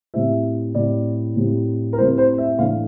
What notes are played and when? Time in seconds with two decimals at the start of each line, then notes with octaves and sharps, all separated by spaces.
0.14 A2 G3 C4 E4 E5
0.75 A2 G3 C4 E4 D5
1.36 A2 G3 C4 E4
1.93 A#4
1.97 A2 G3 C4 E4 C5
2.18 C5
2.38 E5
2.59 A2 E3 A3 D4 F5